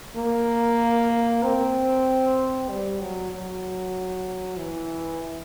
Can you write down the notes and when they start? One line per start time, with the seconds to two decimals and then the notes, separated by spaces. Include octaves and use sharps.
0.17 A#3
1.43 C4
2.69 G3
3.00 F#3
3.32 F#3
4.57 E3